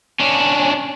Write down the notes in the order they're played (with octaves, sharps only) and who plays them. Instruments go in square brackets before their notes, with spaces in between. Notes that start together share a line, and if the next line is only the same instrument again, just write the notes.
[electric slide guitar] C#4 D4